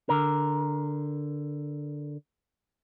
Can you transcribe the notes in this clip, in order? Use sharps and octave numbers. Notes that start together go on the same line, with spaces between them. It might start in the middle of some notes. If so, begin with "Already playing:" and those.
D3 A#4